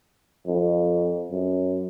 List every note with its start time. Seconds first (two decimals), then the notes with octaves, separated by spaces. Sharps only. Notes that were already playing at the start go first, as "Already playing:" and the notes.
0.47 F2
1.31 F#2